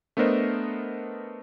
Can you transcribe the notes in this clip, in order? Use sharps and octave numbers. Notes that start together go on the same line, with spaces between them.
A3 B3 D4 A#4 C5 D#5